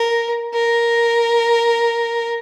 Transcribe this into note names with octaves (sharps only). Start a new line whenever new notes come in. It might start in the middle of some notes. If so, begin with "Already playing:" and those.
Already playing: A#4
A#4